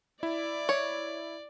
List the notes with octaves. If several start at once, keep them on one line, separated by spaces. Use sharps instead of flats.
E4 D5
C#5